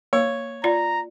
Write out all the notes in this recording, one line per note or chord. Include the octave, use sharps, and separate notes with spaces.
A#3 C#5
F4 D5 A#5